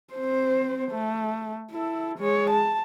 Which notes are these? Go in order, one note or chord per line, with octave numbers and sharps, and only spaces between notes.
C4 C5
A3
E4 A4
G#3 C#5
A5